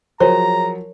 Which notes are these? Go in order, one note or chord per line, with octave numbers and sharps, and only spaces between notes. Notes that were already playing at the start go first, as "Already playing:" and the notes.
F3 F#3 F#4 G#4 A#4 C5 C#5 A#5